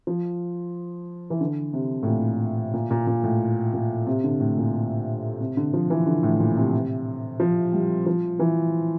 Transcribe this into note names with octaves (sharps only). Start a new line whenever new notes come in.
F3
E3
D3
C3
A2
A#2
A#2
A#2
A#2
A2
A#2
C3
D3
A2
A#2
C3
D3
F3
E3
D3
A2
A#2
C3
F3
G3
F3
E3